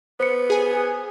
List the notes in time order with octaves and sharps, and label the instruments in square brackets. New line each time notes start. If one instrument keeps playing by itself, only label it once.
[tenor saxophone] B3 [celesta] C5 C#7
[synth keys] G#4 G#5